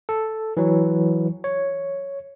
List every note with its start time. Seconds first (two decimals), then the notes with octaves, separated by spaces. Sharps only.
0.09 A4
0.57 E3 F#3
1.44 C#5